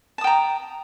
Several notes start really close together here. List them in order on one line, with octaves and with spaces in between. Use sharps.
A5 D#6 G5 A#5